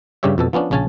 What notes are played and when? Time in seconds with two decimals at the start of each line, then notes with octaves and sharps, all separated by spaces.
0.23 G2 C#3 G3 G4 C#5 E5
0.38 F2 B2 A4
0.53 F3 B3 C#4 D4
0.71 A#1 C#3 C#4 G#5 A5